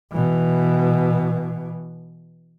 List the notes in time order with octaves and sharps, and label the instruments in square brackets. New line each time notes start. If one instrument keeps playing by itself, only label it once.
[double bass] B2 E3